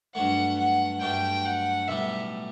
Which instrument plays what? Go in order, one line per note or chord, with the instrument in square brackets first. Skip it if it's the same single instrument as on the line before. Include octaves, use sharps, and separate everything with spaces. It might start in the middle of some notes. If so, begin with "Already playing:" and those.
[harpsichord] G2 F#3 A3 [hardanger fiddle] F#5
[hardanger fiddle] F#5
[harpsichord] G2 F#3 A3 [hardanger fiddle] G5
[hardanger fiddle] F#5
[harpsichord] B1 A2 G3 [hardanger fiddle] E5